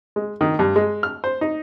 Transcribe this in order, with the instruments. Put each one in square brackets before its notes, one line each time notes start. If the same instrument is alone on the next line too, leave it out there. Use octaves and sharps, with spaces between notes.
[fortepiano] G#3
D#3
G2
G#3
F6
C5
D#4